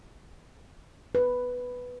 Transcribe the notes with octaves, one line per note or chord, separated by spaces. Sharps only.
B4